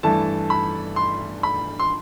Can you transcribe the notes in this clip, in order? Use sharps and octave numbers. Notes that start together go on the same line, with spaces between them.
G2 E3 A3 A5
B5
C6
B5
C6